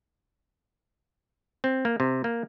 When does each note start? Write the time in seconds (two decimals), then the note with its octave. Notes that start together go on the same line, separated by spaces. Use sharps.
1.64 C4
1.85 A#3
2.00 C3
2.24 A#3